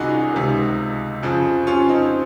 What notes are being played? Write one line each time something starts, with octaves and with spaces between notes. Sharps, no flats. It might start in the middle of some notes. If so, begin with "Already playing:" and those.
Already playing: C2 C3 D#3 C#4 D#4 F4 F#4 G#4
C#2 C3 D#3
F2 C#3 F3
C#4 F4
C4 D#4